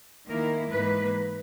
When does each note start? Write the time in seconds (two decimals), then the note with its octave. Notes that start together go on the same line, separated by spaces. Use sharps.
0.28 D#3 A#3 E4 A#4
0.71 G#2 E3 A#3 B4